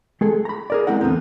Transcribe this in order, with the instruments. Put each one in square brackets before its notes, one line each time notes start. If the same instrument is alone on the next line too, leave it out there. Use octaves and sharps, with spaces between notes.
[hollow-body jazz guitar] G#3 G#4 A4
A#5 B5
G#4 A#4 D5
G#3 C4 E4 A#4 F#5
E2 D3 F3 B3 C4